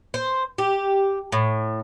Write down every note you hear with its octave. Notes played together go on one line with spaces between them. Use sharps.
C5
G4
A2